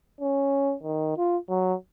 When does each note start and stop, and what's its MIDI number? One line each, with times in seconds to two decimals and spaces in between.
0.21 0.75 61
0.83 1.17 51
1.17 1.38 65
1.49 1.74 54